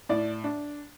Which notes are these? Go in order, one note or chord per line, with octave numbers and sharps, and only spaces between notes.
A2 D5
D4